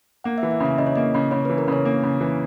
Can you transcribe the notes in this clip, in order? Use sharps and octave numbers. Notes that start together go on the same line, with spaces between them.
A#3 F#5
E5
E3
E5
C#3
E5
C#3 D#5
C#5
A#3 D#5
C#3
C#3 C#5
E3 B4
A#4
C#3 C#5
A#3
C#3
E3